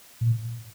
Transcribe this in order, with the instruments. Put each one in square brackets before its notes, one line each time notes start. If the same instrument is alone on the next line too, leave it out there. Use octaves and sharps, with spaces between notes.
[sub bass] A#2